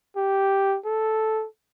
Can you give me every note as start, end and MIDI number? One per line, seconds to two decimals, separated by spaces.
0.16 0.77 67
0.85 1.46 69